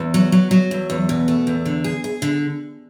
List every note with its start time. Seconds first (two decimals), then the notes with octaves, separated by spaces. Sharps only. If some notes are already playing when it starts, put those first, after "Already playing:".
Already playing: E2
0.14 F#3
0.32 F#3
0.51 F#3
0.71 E2
0.90 E2
1.09 B2
1.28 A3
1.47 E2
1.66 D3
1.84 G#4
2.04 G#4
2.22 D3